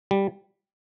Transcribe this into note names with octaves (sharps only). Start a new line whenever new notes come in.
G3